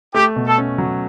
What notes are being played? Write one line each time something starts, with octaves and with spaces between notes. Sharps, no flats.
A3 G4
B2
A4
C#4
F#3